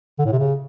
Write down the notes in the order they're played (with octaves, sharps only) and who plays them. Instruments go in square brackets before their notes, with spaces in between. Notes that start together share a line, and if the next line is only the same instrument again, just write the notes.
[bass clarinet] D3
A2
C3
C#3